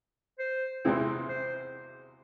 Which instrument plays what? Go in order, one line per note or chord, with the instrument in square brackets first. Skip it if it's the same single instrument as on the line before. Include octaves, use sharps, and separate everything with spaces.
[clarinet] C5
[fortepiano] E2 C3 E3 G#3 C4
[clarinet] C5